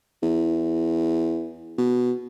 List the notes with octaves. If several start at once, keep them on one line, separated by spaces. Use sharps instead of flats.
E2
B2